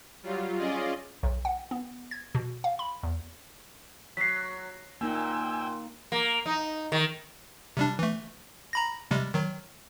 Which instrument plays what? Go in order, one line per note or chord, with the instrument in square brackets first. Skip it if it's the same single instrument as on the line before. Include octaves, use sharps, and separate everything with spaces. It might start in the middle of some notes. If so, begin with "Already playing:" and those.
[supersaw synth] F#3 G3 F4
C#4 F4 G#4 D5 D#5
[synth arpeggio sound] B1
F#5
B3
G#6
B2
F5
B5
E2
[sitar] F#3 [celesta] B6 C7
[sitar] A#2 [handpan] A#3 D#4 [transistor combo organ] G5 G#5 E6
[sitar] A#3
D#4
D#3
[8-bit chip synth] C3 G3 D4
E3 A3
A#5 B5 A#6
C3 G3 G#3
D#3 F#3